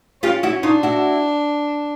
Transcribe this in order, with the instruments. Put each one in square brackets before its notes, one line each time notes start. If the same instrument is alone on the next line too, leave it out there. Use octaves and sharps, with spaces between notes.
[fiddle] C#4 [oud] F4 G4
[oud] E4 F#4
[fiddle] D4 [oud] D#4 F4
[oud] E4 F#4